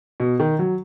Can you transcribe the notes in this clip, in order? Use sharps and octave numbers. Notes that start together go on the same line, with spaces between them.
B2
D#3
F#3